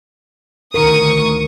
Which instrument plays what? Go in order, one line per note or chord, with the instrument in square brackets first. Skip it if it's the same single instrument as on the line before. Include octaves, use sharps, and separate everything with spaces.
[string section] D2 C#6 D#6 [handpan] D#3 A#4